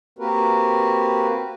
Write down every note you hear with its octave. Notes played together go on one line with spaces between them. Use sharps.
A#3 C4 F#4 G4 A#4 B4